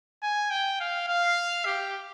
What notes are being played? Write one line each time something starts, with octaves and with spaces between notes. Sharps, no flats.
G#5
G5
F5
F5
G4